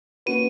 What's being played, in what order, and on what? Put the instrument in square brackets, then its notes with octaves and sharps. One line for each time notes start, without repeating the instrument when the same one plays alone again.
[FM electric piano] A#3 C#4 F#4 B4 [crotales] D#7